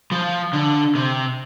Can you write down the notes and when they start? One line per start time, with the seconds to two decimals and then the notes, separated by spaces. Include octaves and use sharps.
0.12 F3
0.53 D3
0.95 C3